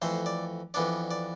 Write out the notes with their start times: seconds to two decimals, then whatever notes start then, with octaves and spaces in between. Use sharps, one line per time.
0.02 F2 E3 A3 C5
0.26 D5
0.74 F2 E3 B3 D4 D5
1.11 D5